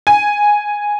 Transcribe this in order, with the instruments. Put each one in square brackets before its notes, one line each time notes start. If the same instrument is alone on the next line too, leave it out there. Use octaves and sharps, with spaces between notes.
[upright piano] G#5